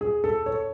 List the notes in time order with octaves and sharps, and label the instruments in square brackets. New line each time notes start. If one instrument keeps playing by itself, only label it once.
[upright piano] G#4
A4
C#5